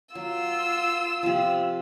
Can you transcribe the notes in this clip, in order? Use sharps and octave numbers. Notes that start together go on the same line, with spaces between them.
F#3 F4 E6
C3 F3